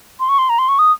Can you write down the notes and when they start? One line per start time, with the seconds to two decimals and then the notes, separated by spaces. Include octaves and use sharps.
0.20 C6
0.29 C#6
0.39 C6
0.49 A#5
0.59 C6
0.69 C#6
0.79 D#6